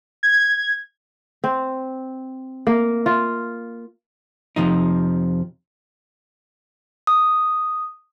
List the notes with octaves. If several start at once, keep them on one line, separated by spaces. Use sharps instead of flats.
G#6
C4
A#3
F4
F2 C3 F3 D#4
D#6